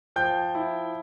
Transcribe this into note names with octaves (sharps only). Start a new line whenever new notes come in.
F3 G5 G6
E4